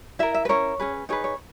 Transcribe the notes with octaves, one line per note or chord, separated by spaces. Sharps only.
E4 A#4 E5
E5
B4
C#4 E4 A#4 C#5
C#4 G#4 B4
D#4 G#4 B4 C#5
C#5